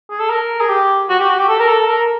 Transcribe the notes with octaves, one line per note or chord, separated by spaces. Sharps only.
G#4
A4
A#4
G#4
G4
F#4
G4
F#4
G4
A4
A#4
A4
A#4